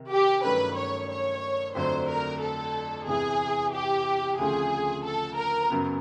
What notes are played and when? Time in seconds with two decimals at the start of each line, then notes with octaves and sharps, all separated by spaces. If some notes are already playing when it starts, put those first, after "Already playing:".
Already playing: C3 D#3
0.11 G4
0.44 G2 D#3 F#3 A3 C#4 B4
0.77 C#5
1.09 C#5
1.75 F2 D3 F#3 A3 D4 C5
2.09 A#4
2.41 A4
3.07 E2 C3 E3 G#4
3.73 G4
4.38 D2 C#3 F3 A3 C4 G#4
5.05 A4
5.37 A#4
5.70 F#2 C#3 F#3 B3